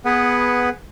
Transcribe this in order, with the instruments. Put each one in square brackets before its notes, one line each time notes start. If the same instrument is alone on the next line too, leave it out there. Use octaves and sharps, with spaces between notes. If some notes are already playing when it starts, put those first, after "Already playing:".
[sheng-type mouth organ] B3 G#4 B4 F#5